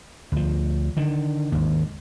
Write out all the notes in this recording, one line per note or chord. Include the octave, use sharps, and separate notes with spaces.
D2 F3
D3 D#3
G#1 D#2